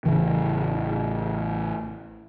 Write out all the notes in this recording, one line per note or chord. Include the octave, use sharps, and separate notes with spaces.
A1 C#3 E3